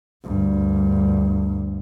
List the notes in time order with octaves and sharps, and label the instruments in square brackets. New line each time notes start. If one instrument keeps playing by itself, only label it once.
[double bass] D2 G2